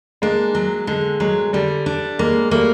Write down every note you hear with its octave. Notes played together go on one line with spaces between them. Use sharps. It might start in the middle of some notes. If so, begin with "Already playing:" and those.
G#3 A#3 D4
F#3
D3 G#3
F#3 G#3
D3 G3
D4
G#3 A#3
G3 A3 A#3